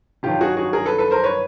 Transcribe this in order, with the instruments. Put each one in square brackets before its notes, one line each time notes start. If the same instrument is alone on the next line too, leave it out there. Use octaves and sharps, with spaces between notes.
[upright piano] G1 G2 D#3 F#3 F4 G4
F#4 G#4
F#4 G#4
G#4 A#4
A4 B4
A4 B4
A#4 C5
B4 C#5